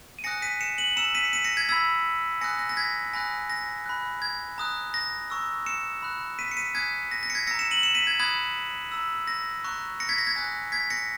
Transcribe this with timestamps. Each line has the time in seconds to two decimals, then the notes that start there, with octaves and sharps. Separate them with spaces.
0.19 D#7
0.24 G#5 D#6 F#6 A#6 C#7
0.42 B6 D#7
0.61 C#7 E7
0.78 D#7 F#7
0.96 A#5 E6 C#7 E7
1.15 B6 D#7
1.25 C#7
1.33 B6 D#7
1.44 A#6 C#7
1.57 G#6 B6
1.69 B5 E6 G#6 B6
2.41 G#5 D#6 F#6 A#6 C#7
2.59 A#6
2.69 A#6
2.77 G#6 B6
3.13 G#5 B5 D#6 F#6 A#6
3.50 A#6
3.86 B5 F#6
4.22 G#6
4.58 A#5 D#6 F#6
4.94 A#6
5.30 A#5 C#6 E6
5.66 C#7 E7
6.02 B5 F#6
6.39 B6 D#7
6.51 C#7
6.57 B6 D#7
6.75 G#5 D#6 F#6 G#6 B6
7.11 A#6
7.23 A#6
7.30 C#7
7.35 G#6 B6
7.47 E6 A#6 C#7
7.51 A#5
7.59 C#7 E7
7.71 D#7 F#7
7.83 C#7 E7
7.95 B6 D#7
8.07 G#6
8.20 B5 D#6 F#6 G#6
8.92 A#5 E6
9.27 A#6
9.64 A#5 C#6 F#6
10.00 A#6 C#7
10.09 G#6 B6
10.18 A#6
10.27 G#6
10.36 G#5 D#6 F#6 A#6
10.72 G#6 B6
10.90 A#6 C#7